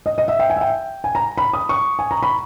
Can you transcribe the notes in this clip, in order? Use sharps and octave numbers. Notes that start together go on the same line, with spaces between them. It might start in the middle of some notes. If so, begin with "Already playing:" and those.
D#5
D#5
E5
G5
G#5
E5
G5
G#5
A#5
B5
D#6
C#6
G#5
A#5
B5